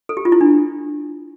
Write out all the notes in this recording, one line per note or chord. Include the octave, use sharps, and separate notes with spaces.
A4
G4
F4
E4
D4